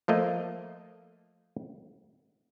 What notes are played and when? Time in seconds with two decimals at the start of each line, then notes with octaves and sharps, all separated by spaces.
0.08 F3 A3 A#3 D#5